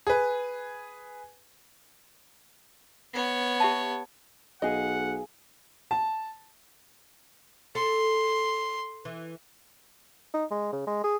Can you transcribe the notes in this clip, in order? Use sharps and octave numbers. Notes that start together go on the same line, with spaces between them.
G#4 B4
B3 C#5
G4 E5 A5
B1 G#4 D#5 F5 F#5
A5
A4 C6
E3
D#4
G#3
C#3
G#3
G#4